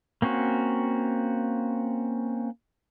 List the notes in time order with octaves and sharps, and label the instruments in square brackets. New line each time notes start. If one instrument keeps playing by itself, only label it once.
[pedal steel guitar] A#3 C4 C#4 F#4